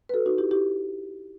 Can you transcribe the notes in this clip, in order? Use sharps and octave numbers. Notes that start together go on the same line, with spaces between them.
B4
F#4 A4
D#4 F#4
E4 G4
E4 G4